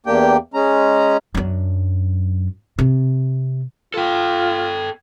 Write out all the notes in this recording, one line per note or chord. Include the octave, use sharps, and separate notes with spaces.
E2 A#3 D4 G4 G5
G#3 C#4 A#5
F#2 D4
C3
F4 A4 G5